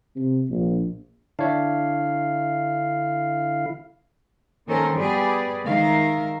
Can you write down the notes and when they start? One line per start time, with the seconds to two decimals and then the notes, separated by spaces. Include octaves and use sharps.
0.16 C3
0.49 A#1
1.39 D3 D4 E4 C#5 E5 F5
4.67 D#3 A#3 C#4 A4 A#4 C5
4.96 G3 B3 G4 G#4 B4 D5
5.64 D#3 G#3 A#4 E5 F5